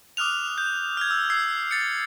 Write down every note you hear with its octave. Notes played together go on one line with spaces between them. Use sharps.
D6 D#6 F6 F#6 F7
G6
F6 G#6
E6
E6 G#6 C7
A6 C#7